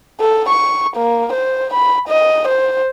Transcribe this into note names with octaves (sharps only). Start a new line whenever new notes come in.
A4
C#6
A#3
C5
B5
D#5
C5